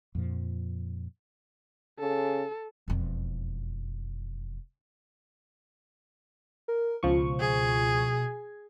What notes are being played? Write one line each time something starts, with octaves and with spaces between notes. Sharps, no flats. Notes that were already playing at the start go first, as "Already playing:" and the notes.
F2 A#2 F3
C#3 A4
E1 F2
A#4
C#2 B2 F3 C#6
G#4